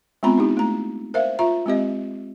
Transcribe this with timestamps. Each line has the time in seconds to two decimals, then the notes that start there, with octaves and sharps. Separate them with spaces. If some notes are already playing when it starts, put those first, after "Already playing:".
0.23 G#3 B3 C4 F4 A#5 B5
0.38 D#4 E4 G4
0.57 A3 A#5
1.14 A#4 C5 E5 F5
1.39 F4 E5 A#5
1.66 G#3 C4 G4 D#5